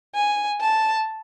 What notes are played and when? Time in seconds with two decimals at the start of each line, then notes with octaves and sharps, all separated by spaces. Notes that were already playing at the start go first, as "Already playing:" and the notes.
0.15 G#5
0.61 A5